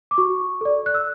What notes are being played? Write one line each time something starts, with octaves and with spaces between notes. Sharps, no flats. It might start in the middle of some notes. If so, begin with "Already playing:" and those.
D6
F#4 C#6
A4 D5
F#6
E6